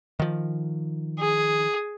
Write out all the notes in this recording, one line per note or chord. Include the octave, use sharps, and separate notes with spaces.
D#3 F3
G#4